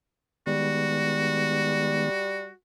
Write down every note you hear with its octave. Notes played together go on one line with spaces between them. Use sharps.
D#3 G3 G#3 B3 F#4